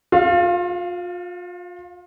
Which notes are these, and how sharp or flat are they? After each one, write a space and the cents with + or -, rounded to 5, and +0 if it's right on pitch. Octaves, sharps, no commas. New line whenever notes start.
F4 +35 F5 -10